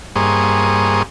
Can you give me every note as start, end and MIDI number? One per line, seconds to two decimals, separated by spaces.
0.16 1.03 43
0.16 1.03 58
0.16 1.03 68
0.16 1.03 72
0.16 1.03 85
0.16 1.03 87